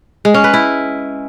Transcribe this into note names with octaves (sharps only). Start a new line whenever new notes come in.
G#3
C#4
B4
E4